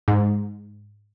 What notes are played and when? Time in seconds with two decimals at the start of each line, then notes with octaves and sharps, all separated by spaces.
0.08 G#2